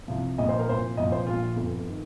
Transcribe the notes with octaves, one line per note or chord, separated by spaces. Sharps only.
C2 C3 F3
A#1 A#2 F3 D#5
C5
A#4
C2 A#2 F3 C5
C2 A#2 F3 D#5
C5
A#1 A#2 F3 F4
G1 F2 F3
D#3